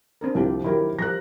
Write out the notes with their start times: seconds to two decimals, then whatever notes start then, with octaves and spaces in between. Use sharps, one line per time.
0.21 C4 D4 A#4
0.35 C2 F3 F4 G4
0.64 D#3 F#3 E4 G4 A#4
0.99 F3 G3 A#4 F#6 A#6